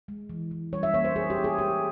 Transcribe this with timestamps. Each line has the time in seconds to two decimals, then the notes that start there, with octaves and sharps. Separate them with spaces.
0.08 G#3
0.30 E3
0.51 E3
0.73 G3 C#5
0.83 E5
0.94 A#3 C#5
1.05 C5
1.16 A#3 G#4
1.30 G4
1.37 A#3
1.44 G#4
1.58 G#3 G4